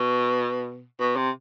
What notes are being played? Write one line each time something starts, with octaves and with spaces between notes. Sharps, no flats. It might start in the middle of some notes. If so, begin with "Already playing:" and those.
Already playing: B2
B2
C3